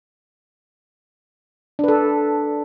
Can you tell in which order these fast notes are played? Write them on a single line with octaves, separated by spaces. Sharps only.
D4 B4 A4